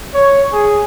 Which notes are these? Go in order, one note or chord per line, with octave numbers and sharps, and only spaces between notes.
C#5
G#4